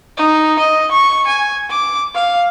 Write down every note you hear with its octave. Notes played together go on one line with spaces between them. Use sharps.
D#4
D#5
C#6
G#5
D6
F5